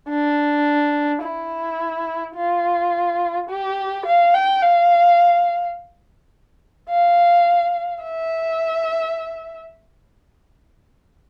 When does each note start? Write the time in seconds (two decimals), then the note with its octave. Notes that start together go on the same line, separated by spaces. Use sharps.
0.09 D4
1.22 E4
2.36 F4
3.50 G4
4.06 F5
4.34 G5
4.62 F5
6.89 F5
8.04 E5